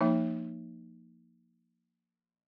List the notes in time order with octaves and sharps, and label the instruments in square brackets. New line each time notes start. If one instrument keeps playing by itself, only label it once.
[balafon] F3 A#3 D#4 E5